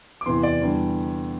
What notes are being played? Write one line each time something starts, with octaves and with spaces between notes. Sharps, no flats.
D6
E2 C3 E3 C6
D5
E2 D3 G3